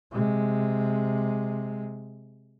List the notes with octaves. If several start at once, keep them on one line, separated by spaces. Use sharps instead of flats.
C3 G#3